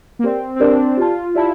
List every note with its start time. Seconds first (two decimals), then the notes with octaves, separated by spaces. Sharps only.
0.19 A#3
0.24 C4 G4 A#4 D5
0.56 C4
0.60 D4 G4 A#4 D5
0.97 F4 G4 D5 A5
1.34 E4 G4 D5 A5